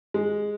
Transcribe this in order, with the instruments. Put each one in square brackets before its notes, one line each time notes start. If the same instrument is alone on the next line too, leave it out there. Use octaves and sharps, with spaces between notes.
[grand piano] G#3